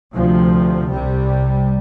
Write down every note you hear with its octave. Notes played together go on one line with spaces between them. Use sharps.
D2 C3 F3
C2 C3 G3